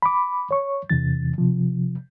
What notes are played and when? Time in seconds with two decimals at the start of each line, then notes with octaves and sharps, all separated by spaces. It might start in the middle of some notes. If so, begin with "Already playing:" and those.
0.02 B5 D6
0.51 C#5 C#6
0.90 E2 C3 E3 A6
1.38 C3 F3